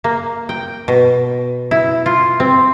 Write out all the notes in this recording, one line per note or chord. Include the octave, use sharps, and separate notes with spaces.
A#3
G5
B2
E4
F4
C4